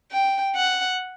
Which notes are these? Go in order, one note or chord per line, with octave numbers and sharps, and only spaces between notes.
G5
F#5